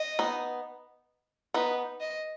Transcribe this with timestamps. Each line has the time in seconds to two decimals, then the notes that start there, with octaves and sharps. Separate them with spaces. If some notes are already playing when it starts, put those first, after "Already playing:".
Already playing: D#5
0.19 B3 D#4
1.54 B3 D#4 B4
2.00 D#5